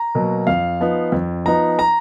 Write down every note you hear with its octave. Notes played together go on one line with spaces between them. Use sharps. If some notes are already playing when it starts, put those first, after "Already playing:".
Already playing: A#5
B2 F#3 A#3
F2 F5
F3 B3 D#4
F2
F3 B3 D#4 A#5
A#5